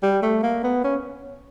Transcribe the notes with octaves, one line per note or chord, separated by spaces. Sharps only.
G3
A3
A#3
B3
C#4